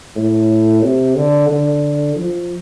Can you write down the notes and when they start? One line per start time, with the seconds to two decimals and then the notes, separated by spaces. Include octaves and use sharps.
0.16 A2
0.83 C3
1.16 D3
1.49 D3
2.16 F3